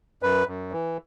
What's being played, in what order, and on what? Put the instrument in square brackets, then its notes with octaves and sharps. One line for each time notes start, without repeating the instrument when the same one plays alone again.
[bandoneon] F#2 B4
F#2
E3